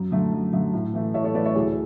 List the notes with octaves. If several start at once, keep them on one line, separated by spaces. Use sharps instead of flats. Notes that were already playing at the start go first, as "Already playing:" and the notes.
Already playing: F#2
D3 A3
F#2
D3 A3
A2
E3 A3
A2 C#5 E5
A4 C#5
E3 A3 B4 D5
C#5 E5
D2 E4 G#4